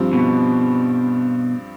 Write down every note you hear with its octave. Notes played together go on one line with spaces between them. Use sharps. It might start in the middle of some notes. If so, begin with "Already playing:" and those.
Already playing: G2 F3 C4 G4
B2